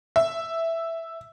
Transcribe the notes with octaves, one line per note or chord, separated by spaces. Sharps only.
E5